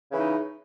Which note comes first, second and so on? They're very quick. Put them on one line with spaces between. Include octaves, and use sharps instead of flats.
C#3 E3 D#4